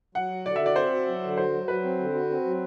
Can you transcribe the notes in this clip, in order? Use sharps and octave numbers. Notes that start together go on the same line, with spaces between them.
F#3 F#5
F#4
D3 D5
E5
F#4 D5
C4 C5
F#4
F#3
D3
F#4 C5
F#3
F#3 B4
C4
D3
F#4
C4
F#3